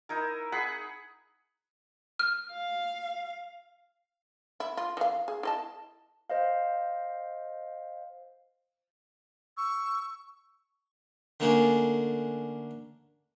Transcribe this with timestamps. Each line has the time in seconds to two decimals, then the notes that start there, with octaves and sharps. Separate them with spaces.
0.09 D#4 E4 A#4
0.52 G#4 F#5 B5
2.19 F6
2.52 F5
4.60 E4
4.77 F4
4.97 E3 F5
5.28 G#4
5.43 E4 D#5 A5
6.30 C5 D#5 F5
9.57 C#6 E6
11.40 D3 A3 A#3 C#4 D4 G#4